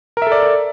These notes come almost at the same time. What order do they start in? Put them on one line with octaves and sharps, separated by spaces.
A#4 E5 A4 D5